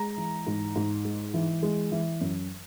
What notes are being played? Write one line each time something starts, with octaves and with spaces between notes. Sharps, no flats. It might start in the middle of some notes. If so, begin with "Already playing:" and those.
Already playing: G#3 A#5
E3
G#2
G#2
G#3
E3
G#3
E3
F#2